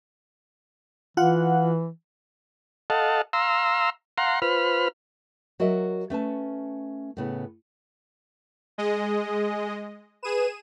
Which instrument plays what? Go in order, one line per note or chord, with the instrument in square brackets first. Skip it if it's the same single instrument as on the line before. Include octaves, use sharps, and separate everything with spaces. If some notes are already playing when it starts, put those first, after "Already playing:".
[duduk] E3 [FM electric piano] F4 F#5
[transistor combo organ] A4 D#5 F5 F#5 A5
F5 A#5 C6 E6
F5 F#5 A#5 C6
F4 B4 C5 B5 F6
[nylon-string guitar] F#3 F#4 A#4 D#5 E5
A3 C#4 B4 A5
A2 C#3 B3
[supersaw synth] G#3 D#5 [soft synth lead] G#4
[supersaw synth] G#4 D#7 E7 [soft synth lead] B4